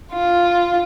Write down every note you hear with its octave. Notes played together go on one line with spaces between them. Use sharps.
F4